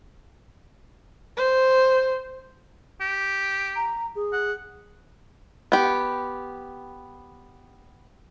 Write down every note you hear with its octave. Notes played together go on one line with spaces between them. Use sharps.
C5
G4
A#5
G#4
F#5
B3 G4